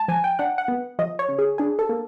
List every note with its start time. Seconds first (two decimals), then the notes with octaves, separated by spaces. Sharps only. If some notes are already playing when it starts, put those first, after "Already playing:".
Already playing: G#3 A5
0.08 F3 G#5
0.24 G5
0.39 D4 F#5
0.58 F#5
0.68 B3
0.99 F3 D#5
1.19 C#5
1.29 C#3
1.39 G#4
1.58 D4 G#4
1.79 A4
1.89 A#3